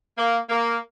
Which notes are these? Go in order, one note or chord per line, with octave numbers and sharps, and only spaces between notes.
A#3
A#3